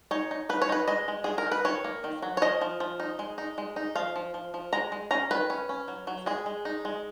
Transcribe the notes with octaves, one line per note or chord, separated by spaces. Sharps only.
D#4 C#5
D#4
D#4 B4
C#5
D#4 B4
G#3 D#5
G#3
G#3 G#4
A#4
D#4
B4
D#3 C#5
A#3
D#3
F#3
C#5
F3 D#5
F3
F3
D#4
G#3
D#4
G#3
D#4
F3 F5
F3
F3
F3
G#3 A#5
G#3
C#4 A#5
D#3 B4
C#4
C#4
F#3
F#3
G#3 G#4
G#3
D#4
G#3